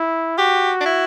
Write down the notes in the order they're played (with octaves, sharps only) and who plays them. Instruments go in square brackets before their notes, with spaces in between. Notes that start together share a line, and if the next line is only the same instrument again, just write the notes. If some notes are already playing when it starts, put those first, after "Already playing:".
Already playing: [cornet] E4
[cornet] F#4 [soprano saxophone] G4
[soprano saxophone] D4
E4